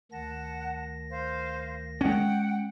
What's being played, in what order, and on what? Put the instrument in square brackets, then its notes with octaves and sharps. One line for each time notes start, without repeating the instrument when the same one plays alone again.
[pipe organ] D2 D#3 A#6 [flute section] F#5 A5
[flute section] C5 F5
[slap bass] G#3 C#4 [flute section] F#5 G5